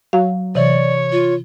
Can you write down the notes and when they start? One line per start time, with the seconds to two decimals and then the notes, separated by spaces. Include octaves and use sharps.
0.13 F#3 F5
0.55 C3 E3 C#5 D5
1.12 F4